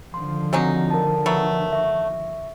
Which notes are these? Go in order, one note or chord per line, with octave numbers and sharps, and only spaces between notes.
D3 D#3 F3 C6
F#3 G#3 C4 D#4 F#4
A#4 A5
F#3 A3 B3
E5 C#6